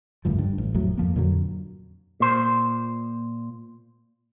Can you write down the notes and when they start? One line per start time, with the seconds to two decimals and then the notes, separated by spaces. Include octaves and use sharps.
0.25 F#1 D2 G2 F3
0.39 G2
0.58 A1
0.74 G#1 F2 A2 F#3
0.98 F2 F3 A#3
1.16 F2 A#2 D3 F#3
2.20 A#2 C5